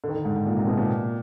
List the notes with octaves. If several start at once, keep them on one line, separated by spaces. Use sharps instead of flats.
D3
D#3
D3
G#2
G#2
A#2
C3
B2
A#2